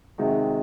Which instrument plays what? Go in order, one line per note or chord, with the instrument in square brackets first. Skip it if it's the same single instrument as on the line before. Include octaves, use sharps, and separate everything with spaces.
[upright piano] C3 D#3 G#3 D#4 F#4